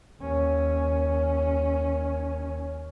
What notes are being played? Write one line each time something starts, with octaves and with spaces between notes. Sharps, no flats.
D#2 C#4